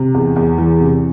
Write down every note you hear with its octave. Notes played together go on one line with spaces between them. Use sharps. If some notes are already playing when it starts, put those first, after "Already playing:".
Already playing: C3
E2
E2
E3
C3